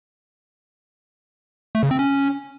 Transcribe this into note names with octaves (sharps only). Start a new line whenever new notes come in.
A3
C#3
C4
C#4